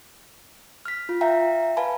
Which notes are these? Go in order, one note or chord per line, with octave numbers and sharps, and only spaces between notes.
F6 B6
F4
E5 F5 G5 A#5
B4 F5 G#5 A5 B5